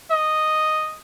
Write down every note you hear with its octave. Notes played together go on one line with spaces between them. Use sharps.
D#5